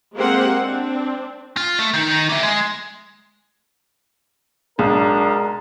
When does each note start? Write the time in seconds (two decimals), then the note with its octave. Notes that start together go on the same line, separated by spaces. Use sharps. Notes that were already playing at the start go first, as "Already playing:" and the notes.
0.16 G#3 A#3 C4 G4 C5 F#5
0.61 C4 D4
1.57 F4
1.79 A3
1.94 D#3 D#4
2.29 A#3 E5
2.43 G#3
4.79 B1 G#3 D4 A#4